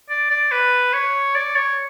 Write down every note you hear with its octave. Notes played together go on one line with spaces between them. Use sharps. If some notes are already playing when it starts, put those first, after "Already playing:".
D5
D5
B4
C#5
D5
C#5